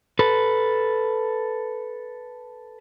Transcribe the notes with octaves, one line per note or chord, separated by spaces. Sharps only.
A4 B4